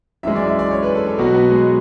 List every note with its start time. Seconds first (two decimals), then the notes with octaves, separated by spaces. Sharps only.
0.23 F#2 E3 G#3 E5
0.36 D5
0.47 E5
0.59 D5
0.71 C#5
0.83 B4
0.95 A4
1.07 A4
1.19 B2 F#3 F#4
1.34 B3
1.50 G#3